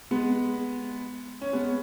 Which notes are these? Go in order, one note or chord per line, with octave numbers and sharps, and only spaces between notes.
G#3 B3
C#4
G#3 B3